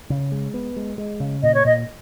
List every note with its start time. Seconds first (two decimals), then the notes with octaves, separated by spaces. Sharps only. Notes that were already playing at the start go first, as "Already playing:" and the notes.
0.10 C#3
0.32 G#3
0.54 B3
0.76 G#3
0.98 G#3
1.20 C#3
1.43 A#2 D#5
1.54 C#5
1.65 A#2 D#5